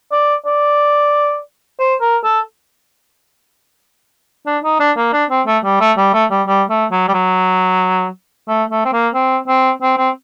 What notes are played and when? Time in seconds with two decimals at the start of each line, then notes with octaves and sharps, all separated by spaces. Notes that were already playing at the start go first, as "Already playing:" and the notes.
0.12 D5
0.46 D5
1.79 C5
2.01 A#4
2.24 A4
4.47 D4
4.64 D#4
4.80 D4
4.97 A#3
5.13 D4
5.30 C4
5.47 A3
5.64 G3
5.81 A3
5.97 G3
6.14 A3
6.31 G3
6.47 G3
6.70 A3
6.92 F#3
7.09 G3
7.14 F#3
8.48 A3
8.71 A3
8.85 C4
8.93 A#3
9.14 C4
9.48 C4
9.82 C4
9.98 C4